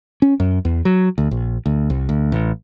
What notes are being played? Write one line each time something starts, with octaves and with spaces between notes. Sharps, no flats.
C#4
F#2
E2
F#3
D2
A#1
D2
C2
D2
A1